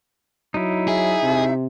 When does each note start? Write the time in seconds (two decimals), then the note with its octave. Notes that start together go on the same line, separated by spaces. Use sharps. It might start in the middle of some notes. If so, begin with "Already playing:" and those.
0.54 F#3 D#4 E4
0.88 G#4 E5
1.22 C3